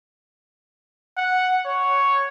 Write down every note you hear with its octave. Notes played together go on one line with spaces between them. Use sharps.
F#5
C#5